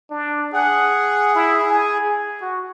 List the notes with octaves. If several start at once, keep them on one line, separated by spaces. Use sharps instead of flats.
D4
G#4 F#5
E4
G#5
F#4